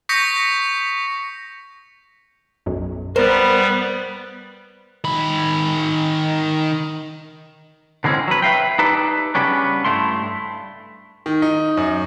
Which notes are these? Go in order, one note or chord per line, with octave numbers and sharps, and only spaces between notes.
C#6 D#6 G6 A#6 B6 C#7
B1 F#2
G3 B3 A#4 C5
D#3 B5
D3 E3 G#3 A#3 C4 C#4
F#3 B4
B4 E5 F5 G5
D#4 G4 A4 B4 D5
C#3 G3 B3 C#4 D4
G2 A3 E4 C6
D#3
D#4
F#2